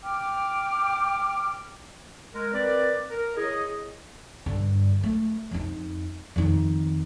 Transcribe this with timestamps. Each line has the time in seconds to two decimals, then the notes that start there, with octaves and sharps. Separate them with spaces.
0.03 G5 D6 F6
2.33 G#3 A#4
2.53 C4 A#4 B4 D5
3.10 A#4
3.36 E4 G#4 C#5 D#5
4.46 G2 D3
5.03 A3
5.51 F2 D#4
6.36 F2 D#3